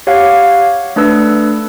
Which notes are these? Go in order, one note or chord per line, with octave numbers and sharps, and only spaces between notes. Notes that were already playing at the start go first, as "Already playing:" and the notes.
G4 C#5 F5 F#5
A3 D4 B4 E6